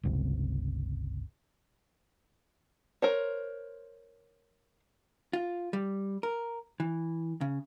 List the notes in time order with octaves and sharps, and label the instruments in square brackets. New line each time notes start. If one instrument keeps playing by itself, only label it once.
[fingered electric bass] G1 C#2 C3
[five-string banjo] A#4 C5 C#5
[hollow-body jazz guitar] F4
G3
A#4
E3
C#3